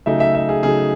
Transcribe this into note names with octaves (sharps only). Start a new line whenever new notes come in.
C#3 F#3 A3 D#4 E5
E5
E5
G#4
C#3 F#3 A3 D#4 G#4